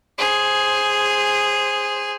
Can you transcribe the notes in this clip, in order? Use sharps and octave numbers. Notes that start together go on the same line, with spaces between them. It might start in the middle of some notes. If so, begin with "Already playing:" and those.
G#4 C5